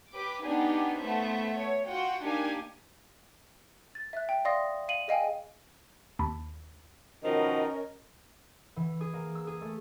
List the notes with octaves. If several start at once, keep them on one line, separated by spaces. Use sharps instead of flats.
G4 B4 D6
B3 D4 D#4 G4 G#4
A3 B3 C5 E5
C#5
F4 F#4 F#5 G5
A#3 D4 D#4 G4 G#5
A6
E5 F#6
G5
D5 E5 F5 C6 D#6 A#6
F5 D#7 F#7
G#4 D#5 F5 G5 G#5
D#2 A5 B5
B2 D#3 F3 C#4 A#4 D#5
E3
G#4
A#3
E6
G#4
A3